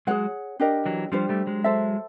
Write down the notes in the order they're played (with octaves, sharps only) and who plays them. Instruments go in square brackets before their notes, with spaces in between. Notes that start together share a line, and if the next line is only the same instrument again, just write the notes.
[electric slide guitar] F#3 G#3 [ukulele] G#4 C#5 F#5
[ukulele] D4 G4 A#4 D#5
[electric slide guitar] E3 F#3
[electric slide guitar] F3 G3 [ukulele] D4 G4 C5
[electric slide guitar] G3 A3
F#3 G#3
[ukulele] A4 C5 E5